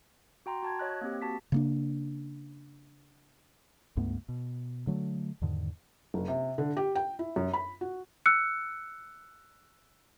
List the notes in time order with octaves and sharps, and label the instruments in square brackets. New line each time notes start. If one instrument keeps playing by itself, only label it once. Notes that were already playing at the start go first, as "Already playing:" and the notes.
[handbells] F#4 G5 A#5 C6
F#4 A5 G#6
C#5 D#5 F#6
A#3 C4 G4
F#4 A5 B6
[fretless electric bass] C#3 A#3 D4
[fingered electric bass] C#2 G2 A3 B3
B2
D3 F#3 A3
E2 G#2 D3 D#3
[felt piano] F#1
C3
D3
G4
G5
E4
F#2
B5
F#4
[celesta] E6 F#6 C#7